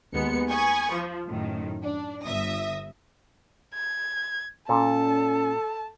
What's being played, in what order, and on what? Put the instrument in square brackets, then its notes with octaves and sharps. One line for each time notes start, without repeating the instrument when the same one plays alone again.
[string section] D#2 G#3 B3 C#7
G#5 B5 C#6 D#6
F3
F#2 A2 D#3
D4
G1 E5 D#6 A#6
[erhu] G#6
[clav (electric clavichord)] A#2 [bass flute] C#4 [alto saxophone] A4 [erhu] A5